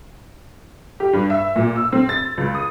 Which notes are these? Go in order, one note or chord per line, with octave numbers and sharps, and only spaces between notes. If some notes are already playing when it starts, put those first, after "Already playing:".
G4
G2
E5
A#2
E6
C4
A6
C#2
D#6